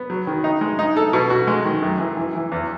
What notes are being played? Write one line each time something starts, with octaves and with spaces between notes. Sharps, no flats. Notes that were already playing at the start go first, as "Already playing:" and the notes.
Already playing: B3
F#3
D#3
D#4
G#3
D#4
A4
B2
F#4
G#3
D#3
F#2
E3
E3
E3
E2